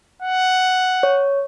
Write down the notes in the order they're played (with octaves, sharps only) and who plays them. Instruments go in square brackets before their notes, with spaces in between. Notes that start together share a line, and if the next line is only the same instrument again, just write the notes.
[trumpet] F#5
[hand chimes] C#5